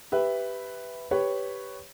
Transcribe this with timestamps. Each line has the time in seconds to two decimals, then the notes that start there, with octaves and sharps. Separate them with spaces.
0.12 G4 B4 E5
1.11 G4 B4 C#5